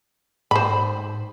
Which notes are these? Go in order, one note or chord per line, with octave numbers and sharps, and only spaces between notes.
G#2 C5 B5